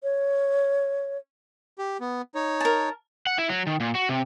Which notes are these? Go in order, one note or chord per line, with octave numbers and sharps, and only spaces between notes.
C#5
G4
B3
D#4 C#5
A#4 A5
F#5
E4
F#3
D#3
A#2
F#4
C3